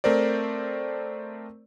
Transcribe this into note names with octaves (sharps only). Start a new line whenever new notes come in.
A3 C4 A#4 C5 D5